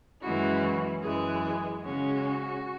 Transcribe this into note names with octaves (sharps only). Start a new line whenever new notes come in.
F#2 E3 G#3 C#4 E4 F#4
F#2 E3 G#3 G#4
C#3 G#3 C#4 F#4